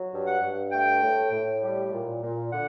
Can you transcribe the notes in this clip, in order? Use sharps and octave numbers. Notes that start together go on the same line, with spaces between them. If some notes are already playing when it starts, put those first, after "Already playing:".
Already playing: F#3
G2
F#5
G2
A3 G5
A2
A2
G3
A#2
A#2
D3 F#5